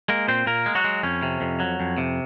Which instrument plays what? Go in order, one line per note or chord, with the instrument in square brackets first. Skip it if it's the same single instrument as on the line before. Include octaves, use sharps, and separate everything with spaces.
[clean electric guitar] G#3 A#3 A#4
A#2 C4 C5
A#2 A#3 A#4
G#3
F#3 F#4
G#3
F2 C#4
C3
F2
F#3
F2
C3